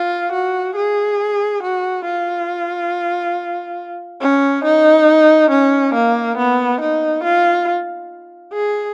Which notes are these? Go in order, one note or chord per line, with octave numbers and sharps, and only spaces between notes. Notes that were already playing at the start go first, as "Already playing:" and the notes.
Already playing: F4
F#4
G#4
F#4
F4
C#4
D#4
C#4
A#3
B3
D#4
F4
G#4